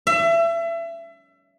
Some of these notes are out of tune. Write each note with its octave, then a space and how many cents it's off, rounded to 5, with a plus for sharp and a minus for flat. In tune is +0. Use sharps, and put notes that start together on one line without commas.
E5 +30